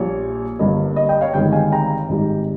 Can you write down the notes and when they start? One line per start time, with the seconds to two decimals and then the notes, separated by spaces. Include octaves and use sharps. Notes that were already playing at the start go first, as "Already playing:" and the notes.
Already playing: A#1 A#2 G3 C#5
0.59 G1 G2 G3 A#3 D#5
0.96 D#5
1.09 D#5 G5
1.21 C#5 F5
1.34 G1 G2 D#3 G#3 C4 D#5 G5
1.52 F5 G#5
1.72 G5 A#5
2.09 G#1 G#2 G3